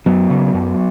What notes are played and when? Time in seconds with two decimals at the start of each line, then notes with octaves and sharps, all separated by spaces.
0.06 F#2 F#3 B3
0.30 C#3
0.54 F#2